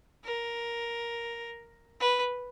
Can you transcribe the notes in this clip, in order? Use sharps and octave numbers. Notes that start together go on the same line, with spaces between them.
A#4
B4